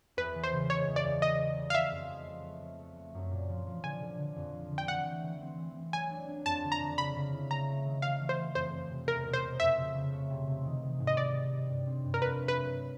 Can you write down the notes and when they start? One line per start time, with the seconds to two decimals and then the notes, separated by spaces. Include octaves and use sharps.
0.17 E2 B4
0.35 E3
0.44 C5
0.52 C#3
0.70 G#3 C#5
0.87 E2
0.96 D5
1.04 E2
1.22 B3 D#5
1.40 G3
1.57 G3
1.70 F5
1.74 D#3 E5
1.92 F2
2.09 G#3
2.27 F3
2.44 A3
2.62 A3
2.79 A3
2.97 A3
3.14 F#2
3.31 A#2
3.49 F3
3.67 F3
3.84 D3 G#5
4.02 D3
4.19 D3
4.36 F2
4.53 F3
4.71 D3
4.78 G5
4.88 E3 F#5
5.06 A3
5.24 E3
5.41 C4
5.58 E3
5.76 C4
5.93 F#3 G#5
6.11 D4
6.28 D4
6.45 F2 A5
6.64 D3
6.72 A#5
6.81 D3
6.98 C#3 B5
7.16 C#3
7.33 E4
7.50 A3 A#5
7.68 A3
7.85 D#3
8.02 E3 F5
8.20 A3
8.29 C5
8.37 E3
8.55 F2 C5
8.73 F2
8.90 C3
9.07 E2 A#4
9.26 B2
9.33 C5
9.42 B2
9.60 F2 E5
9.77 C#3
9.94 C#3
10.13 A3
10.30 C3
10.47 C3
10.65 D#3
10.82 D#3
11.00 G#2
11.07 D#5
11.17 G3 D5
11.34 G3
11.52 G3
11.70 G2
11.87 C4
12.04 G2
12.14 A#4
12.22 F2 B4
12.39 A3
12.48 B4
12.57 F#3